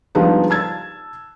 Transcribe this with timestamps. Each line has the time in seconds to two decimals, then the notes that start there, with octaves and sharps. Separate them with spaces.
0.15 F3 G3 G#3 B3 D4 D#4
0.50 A5 E6 G#6 A6